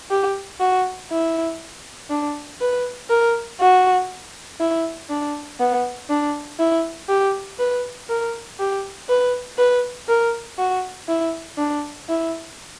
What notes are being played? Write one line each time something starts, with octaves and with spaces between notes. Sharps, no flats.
G4
F#4
E4
D4
B4
A#4
F#4
E4
D4
B3
D4
E4
G4
B4
A#4
G4
B4
B4
A#4
F#4
E4
D4
E4